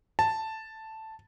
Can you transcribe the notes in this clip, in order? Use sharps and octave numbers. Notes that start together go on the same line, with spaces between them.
A5